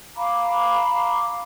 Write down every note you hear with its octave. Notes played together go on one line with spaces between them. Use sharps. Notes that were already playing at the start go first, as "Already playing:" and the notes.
F5 A#5 B5 D6